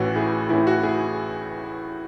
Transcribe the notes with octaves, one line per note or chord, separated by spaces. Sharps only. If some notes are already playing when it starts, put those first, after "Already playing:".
Already playing: A1 A2 E3 F#4
E4 G#4
A1 A2 E3 E4
F#4
E4 G#4